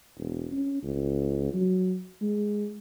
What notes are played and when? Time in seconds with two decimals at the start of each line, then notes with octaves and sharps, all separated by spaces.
0.17 E1
0.52 C#4
0.83 C#2
1.54 F#3
2.22 G#3